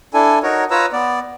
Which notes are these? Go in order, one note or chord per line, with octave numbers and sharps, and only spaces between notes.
D4 E4 A4 G#5
D#4 F#4 A#4 C#5
F4 B4 C#5 A#5 E6
B3 D5